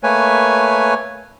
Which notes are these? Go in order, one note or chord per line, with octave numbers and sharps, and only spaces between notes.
A3 A#3 B4 C#5 G#5